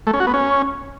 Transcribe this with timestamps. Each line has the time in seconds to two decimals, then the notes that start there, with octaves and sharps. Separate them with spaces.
0.07 A3
0.13 C#4
0.20 F#4
0.27 B3
0.34 C#4